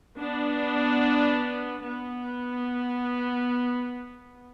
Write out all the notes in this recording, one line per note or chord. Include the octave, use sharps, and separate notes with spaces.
B3 D4
B3